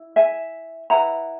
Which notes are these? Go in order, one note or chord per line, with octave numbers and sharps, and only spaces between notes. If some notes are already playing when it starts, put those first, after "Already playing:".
Already playing: E4
E5 G#5
E4 B4 F#5 A#5